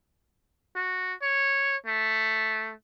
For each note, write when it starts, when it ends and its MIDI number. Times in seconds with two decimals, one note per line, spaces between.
0.76 1.14 66
1.22 1.76 73
1.86 2.74 57